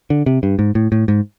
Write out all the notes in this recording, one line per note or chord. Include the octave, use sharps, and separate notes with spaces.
D3
C3
G2
G#2
A2
A2
G#2